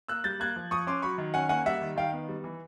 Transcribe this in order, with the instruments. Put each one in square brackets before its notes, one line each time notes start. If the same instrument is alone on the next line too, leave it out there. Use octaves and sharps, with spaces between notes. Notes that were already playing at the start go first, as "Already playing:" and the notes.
[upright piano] A#3 E6 F#6
G3 G6 A6
A#3 F#6 G#6
F3
F3 C#6 D#6
C#4 C6 D6
F#3 B5 C#6
D#3
C#4 F#5 G#5
A#3 F#5 G#5
G3 E5 F#5
D#3
D#3 F5 G5
B3
G3
E3